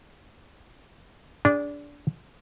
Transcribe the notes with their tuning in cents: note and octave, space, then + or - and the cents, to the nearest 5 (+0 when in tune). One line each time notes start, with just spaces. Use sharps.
D4 -20 G#4 -25